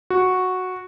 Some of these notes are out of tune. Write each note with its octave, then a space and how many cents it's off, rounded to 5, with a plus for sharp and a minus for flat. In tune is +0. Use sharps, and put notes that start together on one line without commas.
F#4 -5